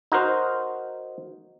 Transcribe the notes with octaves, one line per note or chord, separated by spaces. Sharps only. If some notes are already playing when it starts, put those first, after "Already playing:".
D#4 F#4 A#4 C5